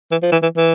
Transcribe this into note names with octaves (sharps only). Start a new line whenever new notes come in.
E3
F3
E3
E3
E3